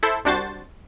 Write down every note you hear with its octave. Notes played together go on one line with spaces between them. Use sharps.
E4 A4 C5
C2 G3 D4 F#4 C5 A6